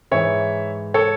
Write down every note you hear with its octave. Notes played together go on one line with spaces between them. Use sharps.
G#2 E3 G#3 C#5 E5
A4 C#5